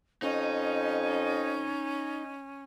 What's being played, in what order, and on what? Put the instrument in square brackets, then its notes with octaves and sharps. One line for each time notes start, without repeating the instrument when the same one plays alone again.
[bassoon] F2 [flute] C#4 [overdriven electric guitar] D#4